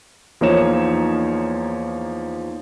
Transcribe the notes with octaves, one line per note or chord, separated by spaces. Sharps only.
E2 F3 A#3 D#4 C#5 E7